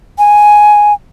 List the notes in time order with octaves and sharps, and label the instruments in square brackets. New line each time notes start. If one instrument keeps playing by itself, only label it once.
[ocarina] G#5